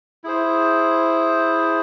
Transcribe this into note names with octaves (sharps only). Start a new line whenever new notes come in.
E4 G#4 C5